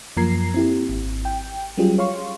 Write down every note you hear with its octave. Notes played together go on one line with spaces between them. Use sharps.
F#2 F3 A#3 A#5 G#6 C7
C4 E4 G4
G#1
G5
F#3 G3 C#4 F4 G4 G#4
C#5 F5 C6 C#6